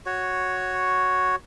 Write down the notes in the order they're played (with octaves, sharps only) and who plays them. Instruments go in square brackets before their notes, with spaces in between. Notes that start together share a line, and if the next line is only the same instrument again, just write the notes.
[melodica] F#4 C#5